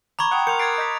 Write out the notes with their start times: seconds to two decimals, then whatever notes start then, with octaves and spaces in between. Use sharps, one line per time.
0.19 A#5 B5 C#6 D6 G#6
0.31 F#5 G5 D#6 F#6
0.47 A#4 C6 F6 G6 C#7 F7
0.59 G#6 A6 C7 D7
0.78 D#5 G6 B6